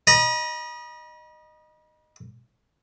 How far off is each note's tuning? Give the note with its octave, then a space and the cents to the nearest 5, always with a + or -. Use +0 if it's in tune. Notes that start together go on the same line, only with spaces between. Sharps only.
D#5 -15 B5 -45